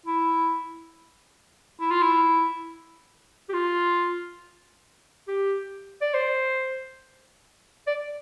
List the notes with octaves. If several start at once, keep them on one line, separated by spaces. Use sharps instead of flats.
E4
E4
F4
E4
G4
F4
G4
D5
C5
D5